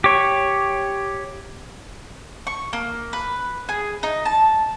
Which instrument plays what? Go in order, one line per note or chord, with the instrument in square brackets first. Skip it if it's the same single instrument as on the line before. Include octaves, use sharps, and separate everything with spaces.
[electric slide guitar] G4 C#5
[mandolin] C#6
A#3
B4
G#4
D#4
A5